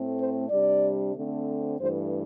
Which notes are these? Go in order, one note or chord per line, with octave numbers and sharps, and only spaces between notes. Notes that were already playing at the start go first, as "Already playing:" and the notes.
Already playing: A2 A3 C4
C5
C3 G3 D4 D5
D3 A3 C4
G2 E3 A3 C5